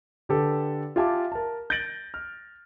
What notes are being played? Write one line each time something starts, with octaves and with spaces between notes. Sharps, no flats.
D3 G4 A4 B4
F4 G4 E5 G#5 A5 D6
A#4 A5
G6 A6 A#6 D7 F#7
F6